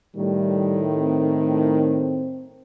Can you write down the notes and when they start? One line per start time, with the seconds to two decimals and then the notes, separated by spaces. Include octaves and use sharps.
0.17 A2 D#3 G3
0.96 C4